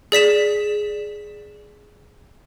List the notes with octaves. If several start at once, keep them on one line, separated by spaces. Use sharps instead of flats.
G#4 D5 B6 E7